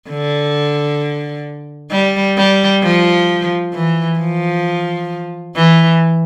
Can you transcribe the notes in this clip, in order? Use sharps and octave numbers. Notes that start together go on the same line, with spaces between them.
D3
G3
G3
F3
E3
F3
E3